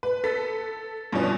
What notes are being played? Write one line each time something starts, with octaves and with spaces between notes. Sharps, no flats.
B4
A4 B6
G2 B2 E3 F3 C#4